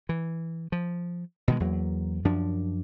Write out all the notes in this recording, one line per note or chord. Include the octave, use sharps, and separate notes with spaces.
E3
F3
B2 D#3 G#3
E2 F#3 A#3
F#2 F3 D4